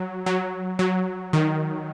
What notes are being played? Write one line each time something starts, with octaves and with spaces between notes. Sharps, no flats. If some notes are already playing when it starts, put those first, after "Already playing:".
Already playing: F#3
F#3
F#3
D#3